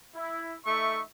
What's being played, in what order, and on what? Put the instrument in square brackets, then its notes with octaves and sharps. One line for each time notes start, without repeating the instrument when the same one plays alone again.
[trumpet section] E4
A3 D#4 E5 C#6